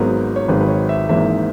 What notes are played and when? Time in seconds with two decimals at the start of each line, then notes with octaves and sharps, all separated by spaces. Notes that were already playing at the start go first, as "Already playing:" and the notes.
Already playing: G#1 G#2 F#3 B3 A#4
0.36 C#5
0.48 G#1 G#2 D#3 F#3 B4
0.61 B4
0.68 C#5
0.89 E5
1.09 G#1 G#2 E3 A#3 E5